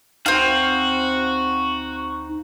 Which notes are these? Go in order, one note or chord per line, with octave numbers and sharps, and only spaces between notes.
D2 C4 D#4 F#4 F5